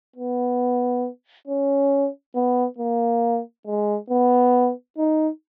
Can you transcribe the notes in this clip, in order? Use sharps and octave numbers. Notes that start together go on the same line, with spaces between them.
B3
C#4
B3
A#3
G#3
B3
D#4